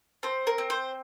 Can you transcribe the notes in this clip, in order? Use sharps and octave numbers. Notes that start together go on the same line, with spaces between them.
C4 C5
A#4
C4
C5